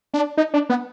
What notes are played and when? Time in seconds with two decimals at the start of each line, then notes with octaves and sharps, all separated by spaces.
0.14 D4
0.37 D#4
0.54 D4
0.70 B3